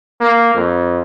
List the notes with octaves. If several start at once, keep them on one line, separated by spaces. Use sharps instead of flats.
A#3
F2